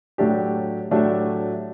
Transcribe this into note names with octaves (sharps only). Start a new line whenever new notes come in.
A2 F#3 A3 D4 G4
A2 F#3 A3 D4 G4